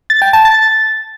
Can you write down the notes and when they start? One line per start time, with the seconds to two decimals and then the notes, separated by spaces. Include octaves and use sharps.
0.10 A6
0.22 G5
0.33 A5
0.45 A6